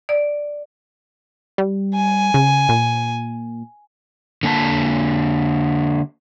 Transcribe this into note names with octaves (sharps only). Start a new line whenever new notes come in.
D5
G3
G#5
C#3
A#2
D3 A#3 G#5 A5